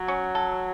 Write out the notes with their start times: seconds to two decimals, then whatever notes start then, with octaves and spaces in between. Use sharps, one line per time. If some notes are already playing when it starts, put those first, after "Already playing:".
Already playing: F#3
0.08 C#4
0.35 A4